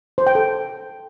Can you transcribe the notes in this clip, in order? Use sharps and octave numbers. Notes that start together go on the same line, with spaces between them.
C5
G5
A4